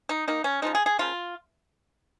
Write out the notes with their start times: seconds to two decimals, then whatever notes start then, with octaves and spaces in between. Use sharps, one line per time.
0.09 D#4
0.27 D#3 A#3 D#4
0.44 C#4
0.62 C#3 F3 G#3 D#4
0.75 G#4
0.86 G#4
0.99 C#3 F3 A#3 F4